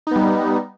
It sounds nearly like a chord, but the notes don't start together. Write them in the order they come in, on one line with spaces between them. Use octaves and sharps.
D#4 B3 G3